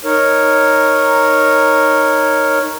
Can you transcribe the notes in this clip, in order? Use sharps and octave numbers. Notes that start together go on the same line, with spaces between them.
D#4 A#4 C#5